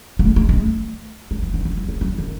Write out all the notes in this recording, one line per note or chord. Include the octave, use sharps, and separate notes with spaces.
G#3
A3
G#3
G#3
A3
G#3
E3
D#3
E3
F#3
G#3
F#3
D#3